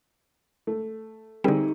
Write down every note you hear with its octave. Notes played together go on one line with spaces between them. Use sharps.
A3
D3 G3 A3 C4 D#4 G4 G#4